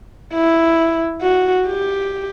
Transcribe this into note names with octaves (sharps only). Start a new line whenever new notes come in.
E4
F#4
G4